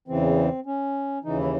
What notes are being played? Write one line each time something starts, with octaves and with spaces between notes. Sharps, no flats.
E2 C#3 E3 C4
C#4
D#2 C#3 E3 D#4
E4